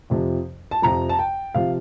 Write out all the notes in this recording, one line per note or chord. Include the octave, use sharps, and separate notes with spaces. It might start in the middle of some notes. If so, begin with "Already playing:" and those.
F2 C3 F3
A5
F2 C3 F3 A#5
A5
G5
C3 F3 F5